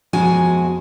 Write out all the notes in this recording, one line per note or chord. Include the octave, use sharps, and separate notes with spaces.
F2 B2 G#3 F#4 G#5